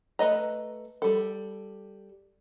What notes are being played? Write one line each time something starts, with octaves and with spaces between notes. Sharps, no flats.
A3 B4 D#5 A#5
G3 A4